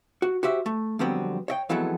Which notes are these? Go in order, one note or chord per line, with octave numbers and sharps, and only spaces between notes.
F#4
F#4 G4 C5 E5
A3
F2 D3 F#3 G3 B3 C4
C#5 D#5 G5
F2 E3 F#3 G#3 B3 A4